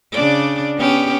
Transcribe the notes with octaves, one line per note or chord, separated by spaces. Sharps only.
C#3 D4 D5
B3 C#4 G4